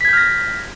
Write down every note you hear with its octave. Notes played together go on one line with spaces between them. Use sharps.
F6 G6 G#6 A#6 B6